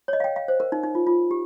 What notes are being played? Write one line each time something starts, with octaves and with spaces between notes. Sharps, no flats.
C#5
D#5
F5
G5
F5
C5
A#4
D#4
D#4
F4
F4
G4